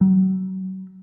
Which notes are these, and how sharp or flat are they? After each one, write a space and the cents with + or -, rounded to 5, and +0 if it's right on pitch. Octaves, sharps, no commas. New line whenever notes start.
F#3 +35